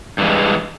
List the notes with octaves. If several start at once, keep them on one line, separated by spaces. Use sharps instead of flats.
G2 E3 G#3